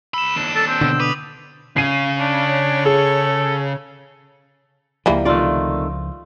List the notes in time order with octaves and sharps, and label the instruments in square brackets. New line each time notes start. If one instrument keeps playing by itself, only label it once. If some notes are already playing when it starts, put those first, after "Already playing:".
[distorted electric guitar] C#2 B5 [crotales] E6 E7
[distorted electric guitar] D#2 D4
[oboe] A4
C4
[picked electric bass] B2 D3
[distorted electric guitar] B4 [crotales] D6 D#6 F7
[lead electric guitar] C#3 [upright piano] C7 D#7
[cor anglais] D4 [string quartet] C#5
[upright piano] G#4 [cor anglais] A4
[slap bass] C#2 F3 [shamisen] E3 G3 A#3
[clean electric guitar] C3 D#3 A3 [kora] F4 D5